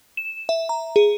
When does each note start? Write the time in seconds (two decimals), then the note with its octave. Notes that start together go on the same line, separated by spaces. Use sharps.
0.17 E7
0.49 E5
0.69 A#5
0.96 G#4